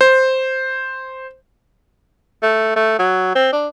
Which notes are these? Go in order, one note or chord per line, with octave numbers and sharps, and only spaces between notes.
C5
A3
A3
F#3
C4
D4